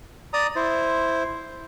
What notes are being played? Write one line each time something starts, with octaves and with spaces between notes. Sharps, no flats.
D5 A#5 D#6
E4 C5